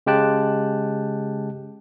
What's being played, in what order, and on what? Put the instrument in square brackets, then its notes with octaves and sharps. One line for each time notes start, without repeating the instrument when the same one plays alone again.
[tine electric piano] C#3 G#3 G4 G5 A5 F#6